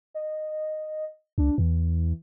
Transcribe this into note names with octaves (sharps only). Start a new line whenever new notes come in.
D#5
C#2 D4
E2 E3